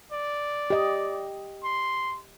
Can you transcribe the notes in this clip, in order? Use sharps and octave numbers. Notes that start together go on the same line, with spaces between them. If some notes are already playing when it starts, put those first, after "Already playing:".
D5
G4 D#5
C6